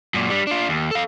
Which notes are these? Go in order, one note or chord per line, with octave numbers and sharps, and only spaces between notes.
F#2 A#2
G3 D4
D4 F4
D#2
A4 F5